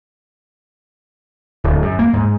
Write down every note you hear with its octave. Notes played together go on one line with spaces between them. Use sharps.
D1
F#2
A#3
G#2